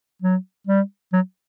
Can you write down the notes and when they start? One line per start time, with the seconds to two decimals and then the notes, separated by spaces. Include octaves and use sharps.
0.22 F#3
0.67 G3
1.13 F#3